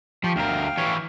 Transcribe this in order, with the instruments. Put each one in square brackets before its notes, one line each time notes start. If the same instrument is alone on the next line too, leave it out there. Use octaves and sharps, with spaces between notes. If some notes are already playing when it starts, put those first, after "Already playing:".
[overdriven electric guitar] F3 [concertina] G4 C#6
[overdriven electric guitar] D2 A#4 [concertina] F5 G5
[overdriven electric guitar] E3 C#5